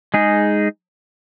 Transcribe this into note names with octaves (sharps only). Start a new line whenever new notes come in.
G#3 D#4 G#4